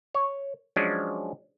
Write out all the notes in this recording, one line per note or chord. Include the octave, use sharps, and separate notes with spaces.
C#5
F3 F#3 G#3 C#4 D4